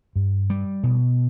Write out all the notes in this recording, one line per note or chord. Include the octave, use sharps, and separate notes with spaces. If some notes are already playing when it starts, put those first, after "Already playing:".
G2
G3
B2